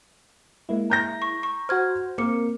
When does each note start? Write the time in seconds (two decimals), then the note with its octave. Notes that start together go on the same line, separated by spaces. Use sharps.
0.69 G#3 A#3 E4
0.90 A#5 G6 A#6
1.22 C#6
1.43 C#6
1.69 F#4 C5 F6 G#6
2.18 A#3 C4 A#4 D6 C#7